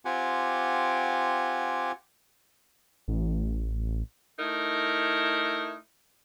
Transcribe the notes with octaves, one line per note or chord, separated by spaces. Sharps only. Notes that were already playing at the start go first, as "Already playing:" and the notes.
C4 F4 G4 F#5 G#5 D6
A1
A3 D#4 E4 A#4